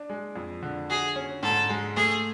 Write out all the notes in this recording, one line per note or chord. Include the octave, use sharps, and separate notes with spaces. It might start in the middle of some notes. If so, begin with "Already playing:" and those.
Already playing: D4
G#3
F2
D3
F#4 G#4
C#4
G#2 A4
G#3
A3 G#4